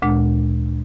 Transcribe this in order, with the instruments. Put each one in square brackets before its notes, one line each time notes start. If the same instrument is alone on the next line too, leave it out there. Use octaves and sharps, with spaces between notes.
[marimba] D2 A#2 G#3 D4